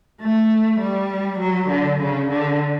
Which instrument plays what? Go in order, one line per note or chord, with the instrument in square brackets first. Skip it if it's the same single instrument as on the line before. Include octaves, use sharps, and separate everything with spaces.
[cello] A3
G3
F#3
D3
C#3
D3